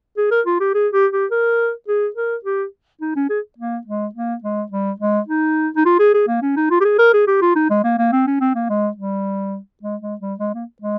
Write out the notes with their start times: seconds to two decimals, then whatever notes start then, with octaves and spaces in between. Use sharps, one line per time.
0.17 G#4
0.31 A#4
0.46 F4
0.60 G4
0.74 G#4
0.93 G4
1.13 G4
1.31 A#4
1.88 G#4
2.16 A#4
2.45 G4
3.01 D#4
3.16 C#4
3.30 G#4
3.58 A#3
3.87 G#3
4.15 A#3
4.44 G#3
4.72 G3
5.00 G#3
5.29 D#4
5.76 D#4
5.86 F4
5.99 G#4
6.14 G#4
6.28 A#3
6.42 C#4
6.57 D#4
6.71 F4
6.81 G4
6.85 G#4
6.99 A#4
7.13 G#4
7.27 G4
7.42 F4
7.56 D#4
7.70 G#3
7.84 A#3
7.99 A#3
8.13 C4
8.27 C#4
8.41 C4
8.55 A#3
8.69 G#3
8.97 G3
9.83 G#3
10.02 G#3
10.21 G3
10.40 G#3
10.54 A#3
10.82 G#3